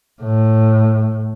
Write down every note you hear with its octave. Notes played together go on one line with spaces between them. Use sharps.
A2